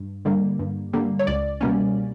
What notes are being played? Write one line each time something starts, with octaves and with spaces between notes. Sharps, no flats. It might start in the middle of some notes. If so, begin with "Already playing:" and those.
Already playing: G2
D3 G3 A#3
G2
D3 G3 A#3
C#5
C#2 D5
B2 G3 A#3 C#4